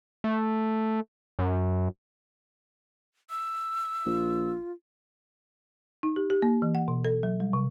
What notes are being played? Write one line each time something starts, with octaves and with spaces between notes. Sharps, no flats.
A3
F#2
E6
A#1 F4
D#4
G4
G4
A#3
E3
F#5
B2
A4
F#3
G3
C3